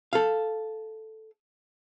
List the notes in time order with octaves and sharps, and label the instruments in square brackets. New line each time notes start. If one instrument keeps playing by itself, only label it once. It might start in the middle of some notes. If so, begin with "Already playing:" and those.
[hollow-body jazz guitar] A4 F5